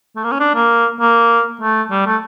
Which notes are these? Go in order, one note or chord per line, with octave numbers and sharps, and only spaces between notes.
A3
A#3
C#4
D4
A#3
A#3
A3
G3
A3